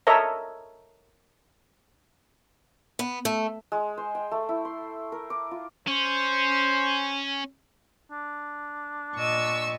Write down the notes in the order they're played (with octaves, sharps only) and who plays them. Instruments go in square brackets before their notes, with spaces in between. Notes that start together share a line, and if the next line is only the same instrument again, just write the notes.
[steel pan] A4 A#4 C#5 D#5 E5 A#5
[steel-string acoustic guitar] B3
A3
[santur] G#3
C5
G5
A3
E4
C6
A#4
D6
F4
[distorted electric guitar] C#4 [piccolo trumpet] C5
[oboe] D4
[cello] A#2 D#5 [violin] C#6 E6